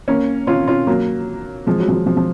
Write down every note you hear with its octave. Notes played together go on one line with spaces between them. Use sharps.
A#3 C#4
C#4 F4
C#4 F4
F#3 A#3
F3 G#3
F#3
F3
F#3
F3
F3